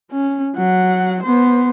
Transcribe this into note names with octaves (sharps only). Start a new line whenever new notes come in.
C#4
F#3 F#5
B3 C5